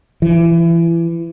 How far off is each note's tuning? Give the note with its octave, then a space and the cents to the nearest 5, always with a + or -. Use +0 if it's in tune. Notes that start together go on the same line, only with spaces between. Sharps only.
E3 +25